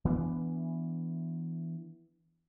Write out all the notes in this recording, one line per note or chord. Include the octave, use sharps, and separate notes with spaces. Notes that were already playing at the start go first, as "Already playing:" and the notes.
E3 B3 D4